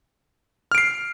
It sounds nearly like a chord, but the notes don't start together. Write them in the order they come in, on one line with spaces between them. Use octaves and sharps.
F6 D7 C7